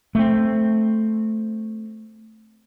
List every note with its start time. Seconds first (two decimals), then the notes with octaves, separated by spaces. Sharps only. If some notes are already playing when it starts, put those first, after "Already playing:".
0.15 A3 C4